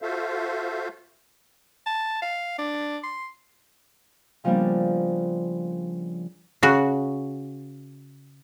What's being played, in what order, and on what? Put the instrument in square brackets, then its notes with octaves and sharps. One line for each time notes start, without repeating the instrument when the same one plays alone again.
[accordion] F4 F#4 A4 C5 E5 F5
[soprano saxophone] A5
F5
D4
C6
[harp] C#3 F3 G3 A#3 B3 D4
[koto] C#3 F#4